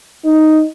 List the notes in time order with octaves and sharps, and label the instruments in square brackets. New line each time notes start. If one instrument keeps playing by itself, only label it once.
[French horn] D#4